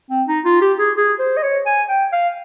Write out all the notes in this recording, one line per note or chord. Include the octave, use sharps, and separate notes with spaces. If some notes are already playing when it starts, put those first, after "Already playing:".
C4
D#4
F4
G4
G#4
G#4
C5
D#5
C#5
G#5
G5
F5